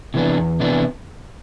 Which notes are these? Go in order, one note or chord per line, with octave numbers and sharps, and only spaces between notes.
C3 E3 B3 D4
E2
C3 E3 B3 D4